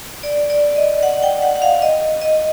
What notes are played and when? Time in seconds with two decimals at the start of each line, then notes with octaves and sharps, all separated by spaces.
0.23 D5
0.50 D5
0.76 D#5
1.03 F#5
1.23 G5
1.42 F#5
1.56 F#5
1.62 F5
1.82 D#5
2.22 D#5